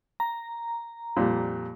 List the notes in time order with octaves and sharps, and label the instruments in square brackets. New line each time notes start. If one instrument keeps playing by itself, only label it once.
[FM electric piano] A#5
[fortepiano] F2 A#2 G3